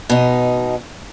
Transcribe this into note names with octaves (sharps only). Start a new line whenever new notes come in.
B2 D#4